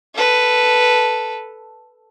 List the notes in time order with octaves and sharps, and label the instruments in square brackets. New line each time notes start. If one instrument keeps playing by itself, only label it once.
[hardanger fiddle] A4 B4